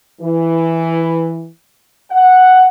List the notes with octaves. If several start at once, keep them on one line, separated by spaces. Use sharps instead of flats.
E3
F#5